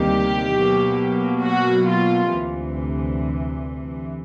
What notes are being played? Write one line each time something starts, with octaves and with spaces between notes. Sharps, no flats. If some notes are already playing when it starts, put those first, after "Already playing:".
Already playing: D2 C3 D#3 G3 A#3 G4
B2 F#3 A#3
F#4
F4
D2 C3 E3